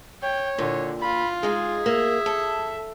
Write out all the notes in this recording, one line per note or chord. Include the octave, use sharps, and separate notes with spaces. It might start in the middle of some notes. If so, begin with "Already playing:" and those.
C#5 G5
A#2 D3
F4 B5
G#3 D#4 G#4
A#3 E5
A4